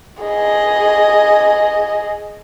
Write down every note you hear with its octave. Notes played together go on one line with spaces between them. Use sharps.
G#4 D#5